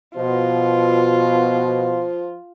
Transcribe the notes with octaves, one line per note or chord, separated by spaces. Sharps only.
B2 F3 F4